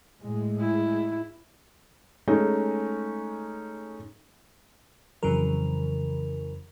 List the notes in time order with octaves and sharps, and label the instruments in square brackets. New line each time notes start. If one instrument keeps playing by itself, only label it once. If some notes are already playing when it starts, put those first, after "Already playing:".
[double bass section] A2 G#3
[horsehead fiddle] E4
[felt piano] G#3 A3 C#4 D#4
[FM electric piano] F2 C#3 E3 F#3 A#4